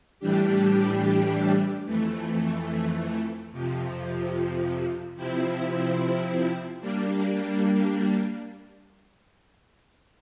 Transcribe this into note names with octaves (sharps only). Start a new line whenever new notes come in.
A2 E3 G3 D4 G4
F2 E3 A3
F2 C3 F3
C3 F3 C4 E4
G3 A#3 D4